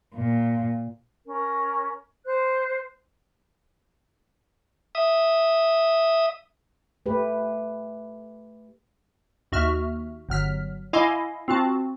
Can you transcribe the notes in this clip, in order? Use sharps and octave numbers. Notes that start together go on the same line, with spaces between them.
A#2
C#4 A#4
C5 F#6
E5 D#6
A3 G4 B4
D#2 F#4 E5 F6
G1 F#3 F6 B6
E4 D#5 F5 G#5 C6 D6
C4 F4 F#4 A5